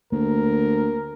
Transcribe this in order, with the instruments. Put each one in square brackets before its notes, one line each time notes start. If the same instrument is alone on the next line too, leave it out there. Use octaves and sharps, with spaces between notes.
[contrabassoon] D2 [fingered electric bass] A#3 [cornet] A#4